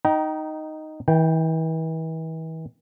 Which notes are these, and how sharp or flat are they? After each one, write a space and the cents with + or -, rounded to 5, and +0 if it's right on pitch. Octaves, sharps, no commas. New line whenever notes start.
D#4 +0 G5 -20 A#5 +25
E3 -40 G5 +0